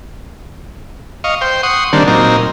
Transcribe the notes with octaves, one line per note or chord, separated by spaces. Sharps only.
D#5 F5 C#6
C5 G5
F#5 C6 C#6 D#6
D3 D#3 G3 A#3 C4 D4
A#2 F#3 C4 D#4 A#4